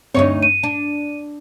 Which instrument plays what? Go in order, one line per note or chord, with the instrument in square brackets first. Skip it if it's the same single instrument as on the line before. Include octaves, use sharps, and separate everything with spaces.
[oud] D2 D#4 C#5 [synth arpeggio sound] G2 C4
[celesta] D#7
[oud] D4